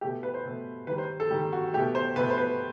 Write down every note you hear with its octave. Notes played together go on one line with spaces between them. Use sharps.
B2 A3 G4
B4
C5
B2 A3
D#3 G3 B4
C5
A4
D#3 G3 G4
F#4
B2 A3 G4
C5
B2 A3 B4
C5
B4